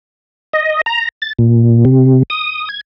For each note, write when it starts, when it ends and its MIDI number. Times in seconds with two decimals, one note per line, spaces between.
0.53 0.81 75
0.86 1.08 82
1.22 1.33 93
1.39 1.85 46
1.85 2.23 48
2.30 2.69 87
2.69 2.81 92